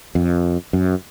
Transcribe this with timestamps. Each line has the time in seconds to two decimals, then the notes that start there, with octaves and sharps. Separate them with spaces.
0.15 F2
0.73 F#2